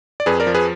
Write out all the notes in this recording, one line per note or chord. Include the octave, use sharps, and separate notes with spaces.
D5
F2 G#4 B4
A#4 D5
F3
G#4 B4